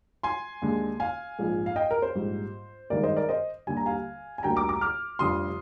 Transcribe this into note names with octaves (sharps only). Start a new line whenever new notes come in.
G#5 C6
D#2 D3 G#3
F5 G#5
A#1 G#2 F3
F5
D#5 G5
A#4
C5
A#1 G#2 G3
G2 D#3 G#3 A#4 D5
C5 D#5
A#4 D5
C5 D#5
D#2 D3 G3 G#5
A#5
F5 G#5
G#5
D2 D3 G3 A#3 G5 A#5
A#5 D6
A#5 D6
D6 F6
F1 F2 D3 G3 C6 D#6